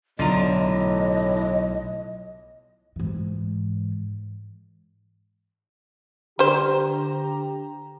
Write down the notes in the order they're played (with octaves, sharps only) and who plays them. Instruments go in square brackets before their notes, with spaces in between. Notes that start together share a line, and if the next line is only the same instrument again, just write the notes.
[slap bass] B1 [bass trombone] A2 [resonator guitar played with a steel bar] D3 F4 A#5 [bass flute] D#5
[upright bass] G#2 E3
[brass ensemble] D3 G4 A#5 [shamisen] G3 C5